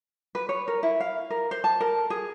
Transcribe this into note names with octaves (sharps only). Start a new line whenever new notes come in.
B4
C#5
A#4
E4
F5
A#4
C5
A5
A#4
G#4